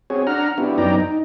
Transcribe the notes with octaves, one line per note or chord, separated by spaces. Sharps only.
C4 F#4 G#4 C#5
D4 F#5 A#5 F6
B3 D4 E4 F#4 G4
F#2 B3 D#4 D5 G5 A#5
D#4